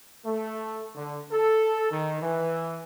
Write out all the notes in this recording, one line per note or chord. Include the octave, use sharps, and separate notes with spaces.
A3
D3
A4
D#3
E3